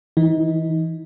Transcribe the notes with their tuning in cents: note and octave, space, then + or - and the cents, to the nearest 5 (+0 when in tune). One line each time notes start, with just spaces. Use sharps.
E3 -5 D#4 +25